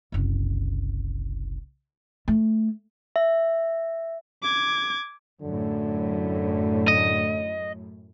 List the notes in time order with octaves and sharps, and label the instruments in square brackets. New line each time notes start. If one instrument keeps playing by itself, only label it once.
[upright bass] F#1 C2
A3
[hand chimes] E5
[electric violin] D6 G#6
[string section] F#2 A2 [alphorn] D3
[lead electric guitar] D#5